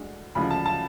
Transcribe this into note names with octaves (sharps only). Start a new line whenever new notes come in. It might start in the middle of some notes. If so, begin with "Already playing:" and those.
Already playing: D2 D3 G#3
D2 C#3 F3 G#3 B5
A5
A5